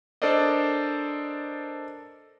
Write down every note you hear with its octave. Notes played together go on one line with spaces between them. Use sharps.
D4 A4 A#4 C5 D5 D#5